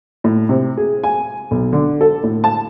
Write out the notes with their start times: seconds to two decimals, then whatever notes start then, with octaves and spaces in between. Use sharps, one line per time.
0.24 A2
0.49 C3
0.77 G#4
1.03 G#5
1.51 B1
1.73 D3
2.01 A4
2.23 A2
2.44 A5